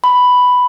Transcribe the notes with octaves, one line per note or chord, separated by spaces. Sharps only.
B5